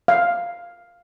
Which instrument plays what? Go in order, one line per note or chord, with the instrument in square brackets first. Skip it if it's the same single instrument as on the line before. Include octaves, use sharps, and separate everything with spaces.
[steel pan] F5